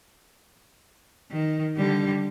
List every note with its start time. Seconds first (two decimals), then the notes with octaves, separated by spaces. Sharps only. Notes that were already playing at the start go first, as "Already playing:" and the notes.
1.31 D#3
1.77 D3 G3